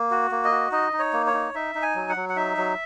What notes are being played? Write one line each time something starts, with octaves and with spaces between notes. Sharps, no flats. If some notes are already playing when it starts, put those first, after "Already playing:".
Already playing: A#3
F#4
A#3
D#5
F#4
D#4 D#5
D#4
C#5
A#3
C#5
D#4
D#4 E5
D#4
G#5
F#3
F#5
F#3
F#5
D#4 E5
F#3